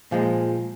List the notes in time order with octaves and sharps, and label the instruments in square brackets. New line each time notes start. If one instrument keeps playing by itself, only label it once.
[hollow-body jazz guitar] A#2 F3 G#3